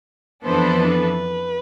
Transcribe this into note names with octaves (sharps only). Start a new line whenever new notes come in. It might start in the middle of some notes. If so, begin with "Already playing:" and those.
F2 E3 B3 D4 A4 C5
B4